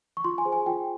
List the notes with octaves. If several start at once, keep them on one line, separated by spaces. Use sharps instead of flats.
C#6
F4 C6
G#5
G#4 C5
G#5
F4 G5